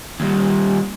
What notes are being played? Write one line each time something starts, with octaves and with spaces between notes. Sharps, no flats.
D#2 G3